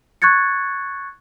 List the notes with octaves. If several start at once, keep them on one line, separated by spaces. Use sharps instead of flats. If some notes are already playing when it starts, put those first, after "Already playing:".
C#6 F#6 G#6 A6 C#7